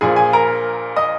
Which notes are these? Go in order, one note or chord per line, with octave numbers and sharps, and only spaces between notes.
A#1 A#2 F3 G#4 G#5
G#4 G#5
A#4 A#5
D#5 D#6